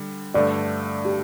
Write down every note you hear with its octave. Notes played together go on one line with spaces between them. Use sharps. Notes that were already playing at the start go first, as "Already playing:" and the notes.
Already playing: D3 G3
G2 D3 A3 D5
G4